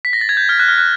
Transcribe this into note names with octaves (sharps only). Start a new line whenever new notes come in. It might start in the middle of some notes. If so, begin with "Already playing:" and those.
B6
A#6
A6
G#6
G6
F6
F#6
F6
F#6